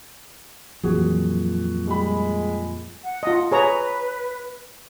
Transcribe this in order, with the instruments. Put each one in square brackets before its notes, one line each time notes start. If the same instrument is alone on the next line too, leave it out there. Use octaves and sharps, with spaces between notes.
[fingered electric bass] F2 A#2 [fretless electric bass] E3 F#3 [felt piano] F#4 G#4
[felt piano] G3 B5 [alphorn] G#3
[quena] F#5
[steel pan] F4 D#5
[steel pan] G#4 C#5 A#5 [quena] B4